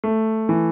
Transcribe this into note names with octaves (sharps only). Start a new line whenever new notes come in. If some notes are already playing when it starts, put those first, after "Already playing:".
A3
E3